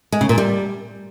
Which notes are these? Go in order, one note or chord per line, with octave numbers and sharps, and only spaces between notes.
G#3
C#3
A#2
G3